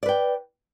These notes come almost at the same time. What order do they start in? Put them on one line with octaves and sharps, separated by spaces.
D5 B4 G5